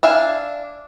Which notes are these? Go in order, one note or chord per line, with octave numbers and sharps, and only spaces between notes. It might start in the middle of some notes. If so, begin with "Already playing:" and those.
D4 E5 F5 G#5